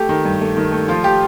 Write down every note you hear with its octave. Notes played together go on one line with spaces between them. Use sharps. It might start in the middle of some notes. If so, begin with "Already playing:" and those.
Already playing: A3 G4
D#3
G2
A3
D#3
A3
F3 F4
F3 G4